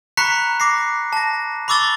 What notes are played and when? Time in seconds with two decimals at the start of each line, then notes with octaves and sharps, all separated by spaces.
0.17 A#5 B5 C#6 F#6 B6 C#7
0.60 D6 A#6 C7
1.13 A5 A#6
1.68 B5 C#6 D6 E6 A6 G7